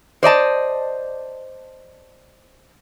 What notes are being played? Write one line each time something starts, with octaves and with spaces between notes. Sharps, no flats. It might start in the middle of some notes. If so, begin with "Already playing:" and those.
C5 D5 D#5 A5